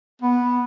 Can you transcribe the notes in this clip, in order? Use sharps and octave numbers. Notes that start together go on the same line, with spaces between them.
B3